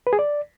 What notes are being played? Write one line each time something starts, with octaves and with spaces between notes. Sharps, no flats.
B4
G#4
D5